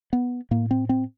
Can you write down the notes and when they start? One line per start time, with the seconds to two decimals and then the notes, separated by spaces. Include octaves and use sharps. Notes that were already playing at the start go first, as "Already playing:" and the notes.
0.13 B3
0.51 A2 A#3
0.71 C4
0.89 C4